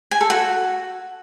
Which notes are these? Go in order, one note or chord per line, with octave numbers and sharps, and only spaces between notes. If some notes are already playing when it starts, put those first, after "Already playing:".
G#5
A4
F#4